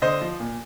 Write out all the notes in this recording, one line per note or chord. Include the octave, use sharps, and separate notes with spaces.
D3 C5 D#5
F3
A#2